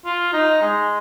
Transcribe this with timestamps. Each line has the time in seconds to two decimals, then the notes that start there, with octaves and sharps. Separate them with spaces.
0.06 F4
0.33 D#4
0.62 G#3